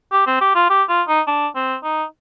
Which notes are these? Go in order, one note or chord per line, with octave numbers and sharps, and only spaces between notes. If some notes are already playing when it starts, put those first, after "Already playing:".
G4
C4
G4
F4
G4
F4
D#4
D4
C4
D#4